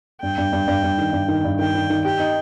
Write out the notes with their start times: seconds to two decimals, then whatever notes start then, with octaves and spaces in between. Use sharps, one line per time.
0.22 G2 G5
0.38 G2
0.52 G2
0.68 G2
0.83 G2
0.98 D#3
1.13 G2
1.28 D#3
1.44 G2
1.59 D#3 G5
1.75 D#3
1.90 D#3
2.05 G4 G5
2.19 D#4